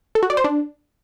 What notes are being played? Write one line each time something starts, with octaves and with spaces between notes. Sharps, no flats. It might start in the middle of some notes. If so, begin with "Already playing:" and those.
A4
F#4
D5
C5
D4